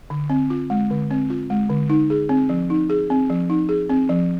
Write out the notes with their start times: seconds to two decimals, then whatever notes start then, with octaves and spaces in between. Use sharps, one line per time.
0.10 D3
0.29 C4
0.50 F4
0.70 G#3
0.90 D3
1.11 C4
1.30 F4
1.50 G#3
1.70 D3
1.89 D#4
2.10 G#4
2.29 C4
2.49 F3
2.70 D#4
2.90 G#4
3.10 C4
3.30 F3
3.50 D#4
3.69 G#4
3.89 C4
4.09 F3